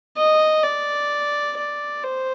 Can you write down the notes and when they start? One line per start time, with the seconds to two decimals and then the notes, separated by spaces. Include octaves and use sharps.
0.17 D#5
0.64 D5
1.57 D5
2.04 C5